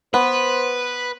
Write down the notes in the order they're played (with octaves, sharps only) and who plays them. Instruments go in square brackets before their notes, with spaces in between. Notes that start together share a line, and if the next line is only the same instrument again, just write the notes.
[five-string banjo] B3 [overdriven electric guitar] B4 [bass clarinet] C5